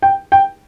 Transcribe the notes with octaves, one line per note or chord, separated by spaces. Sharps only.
G5
G5